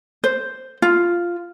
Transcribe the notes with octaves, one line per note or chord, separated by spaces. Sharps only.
C5
F4